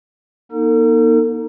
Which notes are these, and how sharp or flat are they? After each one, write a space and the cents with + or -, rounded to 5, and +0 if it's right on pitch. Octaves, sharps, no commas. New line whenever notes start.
A#3 +45 D#4 +5 A4 +45